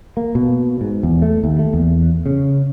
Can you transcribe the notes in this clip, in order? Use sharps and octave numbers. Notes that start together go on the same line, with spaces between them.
A#3
B2
G#2
E2
A3
D#2
A3
E2
C#3